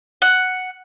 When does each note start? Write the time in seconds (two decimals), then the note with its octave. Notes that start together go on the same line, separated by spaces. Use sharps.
0.22 F#5